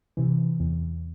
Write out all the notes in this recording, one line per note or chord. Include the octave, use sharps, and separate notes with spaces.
C3 E3
E2